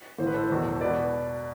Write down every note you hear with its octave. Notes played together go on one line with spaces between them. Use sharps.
A1 A2 E3 C5
B4
A4 C5
E1 E2 B2
B2 B4 D5